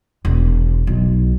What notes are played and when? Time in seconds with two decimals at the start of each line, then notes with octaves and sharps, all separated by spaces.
0.25 E1
0.87 B1